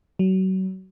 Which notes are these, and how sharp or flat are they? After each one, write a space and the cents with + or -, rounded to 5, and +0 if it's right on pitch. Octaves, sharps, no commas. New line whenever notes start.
F#3 +30